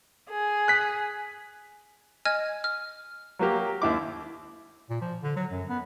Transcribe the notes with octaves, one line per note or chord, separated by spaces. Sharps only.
G#4
F#6 B6
D#5 G#5 F6 G#6
F6
F#3 A#3 G4
D#2 E4 D6
A#2
F3
D3
F#3
F#2
B3